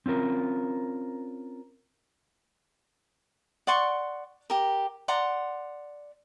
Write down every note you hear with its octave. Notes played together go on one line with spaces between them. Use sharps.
C4 C#4 F4 A#4
D5 F#5 C6 C#6
G4 A#4
D5 F#5 A#5 C6